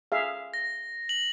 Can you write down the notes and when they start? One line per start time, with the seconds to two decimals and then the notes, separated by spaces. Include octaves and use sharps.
0.12 G#4 E5 F5
0.54 A#6
1.09 F#7